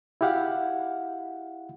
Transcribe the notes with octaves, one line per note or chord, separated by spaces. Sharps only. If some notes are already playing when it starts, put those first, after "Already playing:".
E4 F#4 G4 F5 F#5